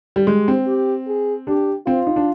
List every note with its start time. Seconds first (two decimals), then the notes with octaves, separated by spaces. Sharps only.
0.16 G3
0.27 G#3 G4
0.48 C4
0.67 G4
1.07 G#4
1.47 D4 G4
1.86 C4 F4
2.07 D#4
2.16 D4